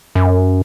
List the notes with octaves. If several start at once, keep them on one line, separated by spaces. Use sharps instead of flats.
F#2